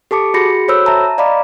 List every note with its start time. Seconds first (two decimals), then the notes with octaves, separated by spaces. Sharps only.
0.11 G4 A4 A5 D6 C#7
0.34 F#4 G#4 B5 A#6 C#7
0.68 F#4 A4 C5 C#5 B5 E6
0.86 E5 A5 A#5
1.18 D5 D#5 F5 A#5 B5 D6